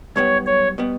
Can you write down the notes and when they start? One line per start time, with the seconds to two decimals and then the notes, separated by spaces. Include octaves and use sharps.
0.16 B1 B2 G3 B3 C#5
0.46 C#5
0.78 B2 G3 B3